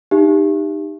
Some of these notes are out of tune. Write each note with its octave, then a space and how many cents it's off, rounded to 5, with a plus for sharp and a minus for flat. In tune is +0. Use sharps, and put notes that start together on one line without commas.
D#4 -15 G4 +15 E5 +35